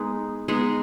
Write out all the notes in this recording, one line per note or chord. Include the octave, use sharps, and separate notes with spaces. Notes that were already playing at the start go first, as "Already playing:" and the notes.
Already playing: G#3 B3 D#4
G#3 B3 D#4